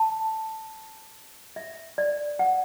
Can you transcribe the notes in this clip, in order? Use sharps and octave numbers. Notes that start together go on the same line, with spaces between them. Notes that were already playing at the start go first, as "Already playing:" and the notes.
Already playing: A5
E5
D5
F#5